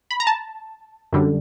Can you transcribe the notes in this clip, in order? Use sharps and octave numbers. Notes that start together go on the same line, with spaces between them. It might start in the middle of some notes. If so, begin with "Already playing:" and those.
B5
A#5
A5
F#2 D3 G3